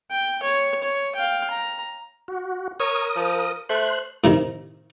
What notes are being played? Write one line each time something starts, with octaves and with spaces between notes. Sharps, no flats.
G5
C#5
C#5
F5 G5
A#5
F#4
A#4 C#5 D#6
F3
A3 C5 F#6
A2 C3 D#3